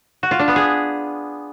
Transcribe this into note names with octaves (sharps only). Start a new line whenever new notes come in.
F#4
F4
D4
B3
G#4